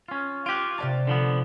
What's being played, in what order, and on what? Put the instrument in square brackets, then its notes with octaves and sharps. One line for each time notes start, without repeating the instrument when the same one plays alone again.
[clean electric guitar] C#4 F4
[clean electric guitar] F4 G4 [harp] F#6 G#6 D7
[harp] C3 D5 A5
[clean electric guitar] D3 F3 B3